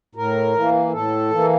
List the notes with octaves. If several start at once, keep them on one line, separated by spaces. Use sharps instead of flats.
A2 A#4
E3 A#3
A2 A4
E3 A#3